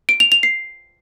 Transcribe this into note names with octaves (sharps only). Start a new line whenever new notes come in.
D7
F7
F7
C7